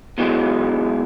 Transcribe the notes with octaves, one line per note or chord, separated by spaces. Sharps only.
B2 E3 F#3 G#3